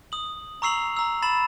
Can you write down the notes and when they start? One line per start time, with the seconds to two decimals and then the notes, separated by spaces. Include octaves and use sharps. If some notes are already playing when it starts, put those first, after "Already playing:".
0.12 D#6 F#7
0.62 A#5 C#6 E6 C7 F7 F#7
0.97 A#5 E6
1.22 B5 A6 E7 F#7